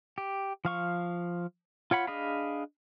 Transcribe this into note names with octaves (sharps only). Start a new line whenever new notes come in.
G4
F3 F5 C#6
F4 C#5 F#5 B5
D4 G#4 D#5 F5 B5